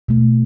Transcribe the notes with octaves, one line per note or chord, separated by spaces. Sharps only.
B2 A3